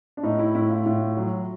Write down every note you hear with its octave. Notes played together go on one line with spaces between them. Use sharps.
D4
A2 D#4
E4
A2 E4
F4
A2
F#3